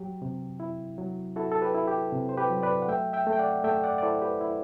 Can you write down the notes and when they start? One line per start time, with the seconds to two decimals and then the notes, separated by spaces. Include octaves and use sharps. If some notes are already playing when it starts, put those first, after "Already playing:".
Already playing: F#3 G4
0.22 C3
0.60 E4
0.98 F#3
1.36 E4 F#4 A4
1.52 A4
1.62 G4 B4
1.75 E4
1.87 G4
2.12 C3
2.29 C5
2.37 G4 B4
2.50 F#3
2.63 B4 D5
2.82 F#5
2.88 A3 E5 G5
3.13 E5 G5
3.27 A3
3.33 G5
3.39 D5 F#5
3.64 A3 E5 G5
3.84 D5 F#5
3.98 D5
4.02 E4 A4 C5
4.21 G4 B4
4.41 E4